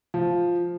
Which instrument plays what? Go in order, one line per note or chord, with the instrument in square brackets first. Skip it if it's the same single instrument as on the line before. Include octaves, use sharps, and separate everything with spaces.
[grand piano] F3